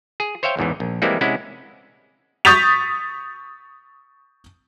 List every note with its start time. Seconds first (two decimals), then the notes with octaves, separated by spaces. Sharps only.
0.20 G#4
0.43 C5 C#5 E5 F5 G5
0.57 A1 E2 G#2 E3
0.80 A#1
1.02 E3 G3 G#3 A#3 C4 E4
1.21 C3 G#3 C#4 E4 F#5
2.45 C#6 D#6 G6 A6 B6 F7